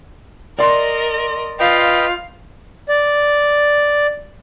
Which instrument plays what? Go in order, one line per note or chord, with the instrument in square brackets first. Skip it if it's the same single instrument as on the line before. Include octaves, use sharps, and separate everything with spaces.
[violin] A#4 D#5 [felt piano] D5 C6
[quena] F4 [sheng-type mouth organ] B4 D#5 G5 [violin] F5
[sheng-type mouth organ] D5